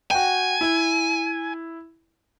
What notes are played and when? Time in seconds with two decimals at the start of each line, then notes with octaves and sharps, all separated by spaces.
0.11 F#4 G5 G#5
0.61 E4